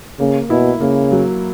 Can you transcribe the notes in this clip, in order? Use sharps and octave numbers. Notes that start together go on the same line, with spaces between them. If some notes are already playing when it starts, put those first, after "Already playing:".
C#3 A#3
B2 E4
C#3 A#3
F#3